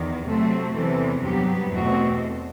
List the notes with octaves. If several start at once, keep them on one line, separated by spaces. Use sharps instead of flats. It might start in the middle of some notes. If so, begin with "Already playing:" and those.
Already playing: E2 D#3
C3 F#3 A3 C4 A4
E2 C3 E3 A4
G2 F#3 B3 G4
E2 B2 A3 C4 F#4